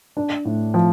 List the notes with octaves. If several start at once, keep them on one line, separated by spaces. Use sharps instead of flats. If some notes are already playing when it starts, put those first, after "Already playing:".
D4
A2
F3